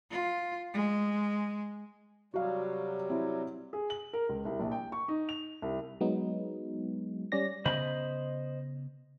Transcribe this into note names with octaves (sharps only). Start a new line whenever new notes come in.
F4
G#3
C3 F#3 G3 F#4 F5
C4 E4
G#4
F#7
A#4
C#2
C2
A#1
G5
C#6
D#4
F7
C2
F#3 G#3 B3 D#4
G3 C#4 D5 A#6
C#3 B3 C5 D#5 B5